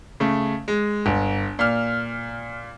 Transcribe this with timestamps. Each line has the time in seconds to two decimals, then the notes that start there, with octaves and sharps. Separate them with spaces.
0.20 C#3 A3
0.68 G#3
1.06 G1
1.59 A#2 F6